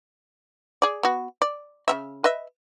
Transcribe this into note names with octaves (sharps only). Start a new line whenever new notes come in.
G#4 D5
B3 F#4
D5
C#3 C#4 E5
B4 D#5 E5